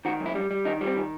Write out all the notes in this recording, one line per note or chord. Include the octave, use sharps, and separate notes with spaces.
D#3 F#4
F#2
E4
G3
G3
D#3 D#4
G3
C4
D#3